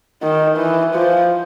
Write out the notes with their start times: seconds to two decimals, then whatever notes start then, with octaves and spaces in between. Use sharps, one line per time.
0.22 D#3
0.58 E3
0.95 F3